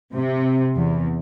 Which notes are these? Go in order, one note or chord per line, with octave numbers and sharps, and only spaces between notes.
C3
E2